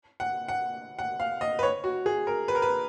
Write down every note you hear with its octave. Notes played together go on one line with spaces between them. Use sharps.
F#5
F#5
F#5
F5
D#5
B4
C#5
F#4
G#4
A#4
B4
A#4
B4